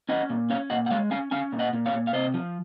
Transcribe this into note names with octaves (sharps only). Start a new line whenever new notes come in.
C#4 D#5 F#5
A#2
C#4 C#5 F5
A#2 D#5 F#5
F#5
G#3 C#5 F5
C#4 F5 G#5
C#4 F5 G#5
A#2
D#5 F#5
A#2
C#5 F5
A#2
F5
C3 C5 D#5
F3